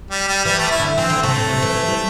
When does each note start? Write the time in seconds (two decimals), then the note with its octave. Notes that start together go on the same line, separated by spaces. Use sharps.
0.11 G3
0.28 G3
0.45 E3 G3
0.58 A3
0.71 E4
0.80 D3
0.97 E3 C4
1.10 D3
1.23 C3 A3
1.36 A2
1.49 C3
1.62 E3
1.75 E3
1.88 G3